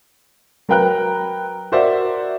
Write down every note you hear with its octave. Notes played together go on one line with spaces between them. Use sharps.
F#3 A#4 B4 G5 A#5 F#6
F#4 A#4 C5 D5 E5 F#5